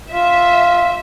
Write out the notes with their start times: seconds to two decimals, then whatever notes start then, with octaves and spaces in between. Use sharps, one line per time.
0.11 F4 E5